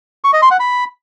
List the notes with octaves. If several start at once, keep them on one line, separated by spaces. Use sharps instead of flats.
C#6
D#5
C6
F#5
B5